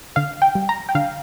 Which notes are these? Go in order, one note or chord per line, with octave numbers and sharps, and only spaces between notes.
D3 F5
G5
G3
A#5
G5
D3 F5